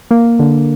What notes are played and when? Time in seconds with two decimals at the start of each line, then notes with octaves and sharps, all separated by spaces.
0.11 A#3
0.39 D3